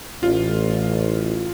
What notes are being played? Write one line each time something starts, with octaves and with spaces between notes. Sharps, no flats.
A1 F4